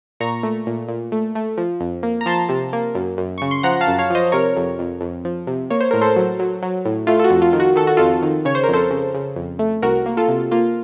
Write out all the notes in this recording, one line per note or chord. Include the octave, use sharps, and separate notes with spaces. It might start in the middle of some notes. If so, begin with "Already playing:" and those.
A#2 A#5 C#6
A3
A#2
A#2
A3
A3
F3
F2
A#3
A#5
F3 A5 C6
C3
A#3
F#2
F#2
C#3 C#6
C6
F3 F#5 A#5
F5 A5
F#2
C#5 F5
F3 C5 D#5
C3 A#4 C#5
F2
F2
F2
F3
C3
A#3 C#5
C5
A2 A#4
A4 C5
F#3
F#3
F#3
A2
A3 F4
A4
F#4
F2
F4
D#3
F#4
D#3 A4
F#4
F2 F4 A4
D#3
C#3 C#5
C5
A#4
F2 A4 C5
C#3
C#3
F2
A3
C2 F#4 A#4
A#3
F4 A4
C3
A#3 F4